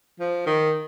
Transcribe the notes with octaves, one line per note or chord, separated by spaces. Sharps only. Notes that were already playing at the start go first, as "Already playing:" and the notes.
F3
D#3